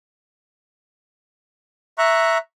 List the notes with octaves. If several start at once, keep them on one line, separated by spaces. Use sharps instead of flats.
E5 A#5 C#6 F#6